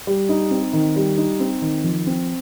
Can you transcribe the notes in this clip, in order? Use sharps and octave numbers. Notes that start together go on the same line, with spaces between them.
G3
D#4
C4
D#3
G3
D#4
C4
D#3
F3
C4